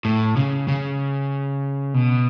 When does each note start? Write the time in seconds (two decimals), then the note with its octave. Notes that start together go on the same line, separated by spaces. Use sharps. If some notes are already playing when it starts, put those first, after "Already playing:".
0.05 A2
0.37 C#3
0.68 C#3
1.94 B2